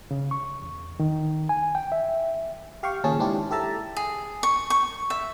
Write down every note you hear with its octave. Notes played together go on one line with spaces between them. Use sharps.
C#3
C#6
E2
D#3
G#5
G5
E5
G4 F5 G5 C#6
D#2 A#2 C#3 C#4 G#4 A5
G#2 C4 D4 E4 G4
G4 A4 E5 A5 A#5
G#4
C#6
C#6
E5